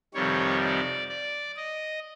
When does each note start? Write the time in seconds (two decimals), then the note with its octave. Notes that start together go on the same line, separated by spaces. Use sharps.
0.14 F2 C3 D#3 G3 C#5
0.61 D5
1.09 D5
1.57 D#5